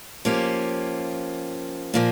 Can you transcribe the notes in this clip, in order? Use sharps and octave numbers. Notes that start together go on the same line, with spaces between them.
F3 A#3 C#4 G4
A#2 F3 A#3